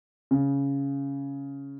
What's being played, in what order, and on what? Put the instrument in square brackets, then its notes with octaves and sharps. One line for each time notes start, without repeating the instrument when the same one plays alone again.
[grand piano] C#3